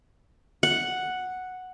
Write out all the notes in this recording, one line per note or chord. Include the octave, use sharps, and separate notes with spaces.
F#5